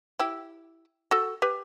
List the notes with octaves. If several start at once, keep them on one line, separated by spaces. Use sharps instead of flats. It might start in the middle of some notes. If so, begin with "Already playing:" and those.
E4 G4
F#4 A4
G4 B4